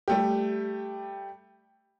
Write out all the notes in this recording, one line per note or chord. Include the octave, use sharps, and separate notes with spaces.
G3 A3 G4